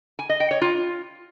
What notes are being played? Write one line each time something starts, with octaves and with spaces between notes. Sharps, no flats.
G#5
D#5
G5
C#5
F4